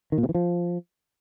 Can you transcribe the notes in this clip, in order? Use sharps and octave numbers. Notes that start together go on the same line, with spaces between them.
D#3
A#2
C3
E3
F3